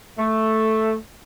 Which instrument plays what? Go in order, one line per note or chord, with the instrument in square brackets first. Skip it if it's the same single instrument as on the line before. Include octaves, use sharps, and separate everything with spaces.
[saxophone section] A3